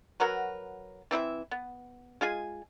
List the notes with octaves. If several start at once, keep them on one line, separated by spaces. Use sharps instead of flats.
F#3 F#4 A#4 B4
E3 C4 E4 E5
B3
G#3 F4 G#4 G#5